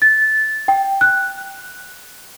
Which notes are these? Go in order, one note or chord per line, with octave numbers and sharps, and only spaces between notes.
A6
G5
F#6